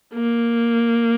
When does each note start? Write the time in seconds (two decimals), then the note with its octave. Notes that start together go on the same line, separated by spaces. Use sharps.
0.14 A#3